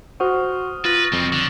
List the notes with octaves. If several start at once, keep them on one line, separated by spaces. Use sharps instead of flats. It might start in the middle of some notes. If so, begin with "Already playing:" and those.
F#4 C5 F#5 C#6 D#6 F6
F4 B4 F6 A6 A#6
F2 F#3 C4
D3